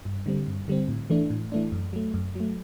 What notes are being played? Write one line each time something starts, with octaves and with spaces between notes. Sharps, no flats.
G2
D3 G3 C4
G2
D3 G3 C4
A2
E3 A3 D4
A2
E3 A3 D4
F#2
F#3 A3
F#2
F#3
A3